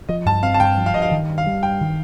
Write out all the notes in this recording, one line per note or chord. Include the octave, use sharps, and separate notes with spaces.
F3 D#5
G2 A5
C4 F5
A5
G2 G5
F3
F5
G2 D#5
F5
D#3
G2
F5
G3
G2 G5
D#3